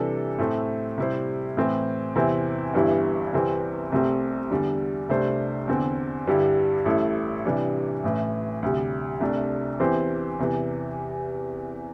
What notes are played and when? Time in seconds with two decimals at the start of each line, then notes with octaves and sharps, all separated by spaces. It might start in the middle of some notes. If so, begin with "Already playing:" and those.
Already playing: C3 E3 G3 D4 A4
0.38 A2 A3 C4 A4
0.98 C3 G3 E4 C5
1.57 A2 E3 C4
2.15 E2 C3 E3 C4 E4
2.74 G1 G2 E3 G3 E4
3.32 C2 C3 E3 C4
3.92 C2 C3 A3 C4
4.51 E2 D3 G3
5.09 C2 C3 A3 D4 C5
5.68 E2 D3 C4
6.27 G2 D3 G3 E4 G4
6.85 A1 A2 G3 E4 A4
7.45 C3 E3 G3 D4
8.04 A1 A2 E3
8.63 D2 C3 G3
9.20 C2 C3 A3 D4
9.79 E2 E3 C4 G4 C5
10.39 E2 C3 E3